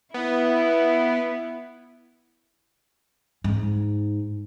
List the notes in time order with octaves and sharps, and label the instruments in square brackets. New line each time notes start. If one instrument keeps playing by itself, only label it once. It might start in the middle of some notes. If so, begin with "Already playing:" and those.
[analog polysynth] B3 [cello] E4
[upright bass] G#2